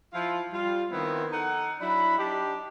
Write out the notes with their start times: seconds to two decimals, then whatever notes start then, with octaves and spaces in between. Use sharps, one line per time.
0.13 F3 E4 F4
0.52 G3 F4
0.91 D#3 F3 B3 C4 E4
1.32 D#4 A4 F#5
1.80 F#3 D4 E4 B5
2.18 D4 D#4 G4